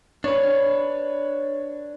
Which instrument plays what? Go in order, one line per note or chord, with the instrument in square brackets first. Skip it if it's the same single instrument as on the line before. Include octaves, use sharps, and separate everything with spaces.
[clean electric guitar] D4 B4 [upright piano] C#5